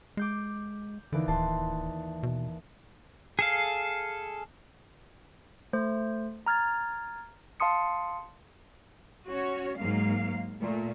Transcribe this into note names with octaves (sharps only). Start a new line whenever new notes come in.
G#3 D6 G6 C7
D#2 D3 E3 D5
D1 A5 C6
B2
G#4 A4 F5
A3 C5
A#5 F6 G#6 A6
F5 A5 C6 D#6 C#7
C#4 F#4 C#5
G#2 F#3 A#3 F5
A#2 A3